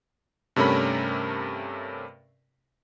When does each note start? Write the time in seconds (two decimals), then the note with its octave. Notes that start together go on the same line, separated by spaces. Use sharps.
0.56 G2 C3 A3 C#4 A#4 B5